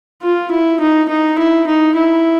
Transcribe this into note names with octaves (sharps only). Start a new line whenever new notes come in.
F4
E4
D#4
D#4
E4
D#4
E4